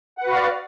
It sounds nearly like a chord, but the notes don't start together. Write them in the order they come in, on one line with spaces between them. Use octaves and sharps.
F#5 B4 F#4 F5 D5